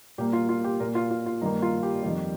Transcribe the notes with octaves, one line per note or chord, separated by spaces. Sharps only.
A#2 G3 A#3 G4
F4
F4
G4
A#2 A#3 A#4
F4
F4
F4
G2 D#3 A#3 D#4
F4
G4
F2 D#3 G3